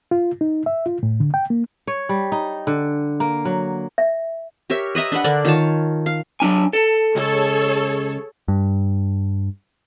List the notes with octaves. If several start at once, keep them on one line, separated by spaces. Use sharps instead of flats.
F4
D#4
E5
F4
A2
D3
G5
A#3
C#5
G3
D#4
D3
A#3
F#3
E5
G4 A#4 C#5 E5
B4 D#5 E5 A#5
D4 B4 F#5
D3 A#4 D5
D#3 F4 C#5 A5
F5
F#3 D4 G#5
A4
C#2 G#4 A4 C#5
G2